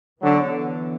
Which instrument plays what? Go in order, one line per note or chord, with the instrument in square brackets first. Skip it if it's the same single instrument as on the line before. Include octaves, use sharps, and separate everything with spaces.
[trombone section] D3 F#3 [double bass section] E3 B3